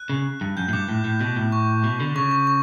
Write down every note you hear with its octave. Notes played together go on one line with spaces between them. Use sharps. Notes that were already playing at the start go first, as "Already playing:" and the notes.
Already playing: F#6
C#3
G2
F#2 G6
A2
G2 D6
A2
A2
B2
A2
C#6
B2
D3
C#3 C#6
C#6
C#6